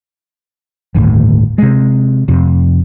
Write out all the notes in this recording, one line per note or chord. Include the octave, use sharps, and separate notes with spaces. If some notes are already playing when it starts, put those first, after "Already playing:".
G1 D#2 A2
C3 G#3
F2 C3